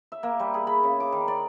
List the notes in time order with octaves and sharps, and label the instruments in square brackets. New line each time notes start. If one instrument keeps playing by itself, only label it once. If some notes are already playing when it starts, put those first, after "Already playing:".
[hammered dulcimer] E5
A#3
G3
G#4
B5
C#3
D6
D#3
D5